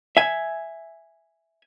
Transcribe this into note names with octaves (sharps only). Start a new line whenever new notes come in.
E5 G#5